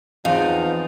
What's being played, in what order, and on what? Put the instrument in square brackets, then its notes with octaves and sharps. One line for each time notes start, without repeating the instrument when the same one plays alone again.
[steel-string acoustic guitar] E2 [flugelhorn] F3 [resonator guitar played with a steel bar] C4 F5 [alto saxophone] D#4